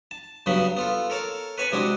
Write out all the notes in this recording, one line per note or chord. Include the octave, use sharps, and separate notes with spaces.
A5
G2 C#3 F#3 B3 B5
B3 F4 A4
A4 A#4 C#5 A5
B4 C#5 G#5 A5 B5 C#6
C3 G#3 D4 E4 F#4